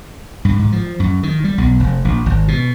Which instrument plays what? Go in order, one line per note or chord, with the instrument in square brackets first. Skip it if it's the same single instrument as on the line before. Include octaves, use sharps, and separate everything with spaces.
[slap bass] G2
G#2
F3
F#2
D#3
G3
B1
F1
A#1
G#1
B2